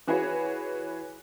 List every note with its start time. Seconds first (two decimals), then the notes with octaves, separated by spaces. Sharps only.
0.07 E3 F#4 G#4 B4 C#5